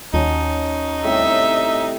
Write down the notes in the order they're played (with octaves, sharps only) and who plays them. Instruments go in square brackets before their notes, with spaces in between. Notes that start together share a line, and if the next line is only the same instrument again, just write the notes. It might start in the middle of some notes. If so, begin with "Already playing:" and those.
[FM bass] D#2 [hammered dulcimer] C#4 F#4 A5 [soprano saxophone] D#4
[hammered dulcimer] A2 C3 G3 [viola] E5